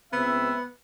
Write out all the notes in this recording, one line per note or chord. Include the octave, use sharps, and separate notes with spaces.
C#2 B3 C4 E5